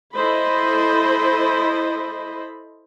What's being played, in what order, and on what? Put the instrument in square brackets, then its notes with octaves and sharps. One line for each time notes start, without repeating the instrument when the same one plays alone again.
[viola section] E4 A4 C5 D#5 B5